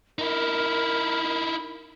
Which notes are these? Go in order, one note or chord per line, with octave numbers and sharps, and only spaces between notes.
D#4 E4 A#4